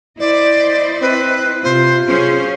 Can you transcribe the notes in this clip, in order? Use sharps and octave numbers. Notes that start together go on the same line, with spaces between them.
E4 C5 D5 D#5
C4 B4
C3 F4 C5
F#3 C#4 G#4 C5